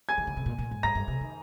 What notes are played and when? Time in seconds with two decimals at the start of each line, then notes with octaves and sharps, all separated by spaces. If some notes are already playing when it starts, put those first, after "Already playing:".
0.09 G#5 G#6
0.18 D#3
0.27 D3
0.37 C3
0.46 A#2
0.59 A#2
0.71 G#2
0.83 G2 A#5 A#6
0.95 G2
1.08 C3
1.21 D#3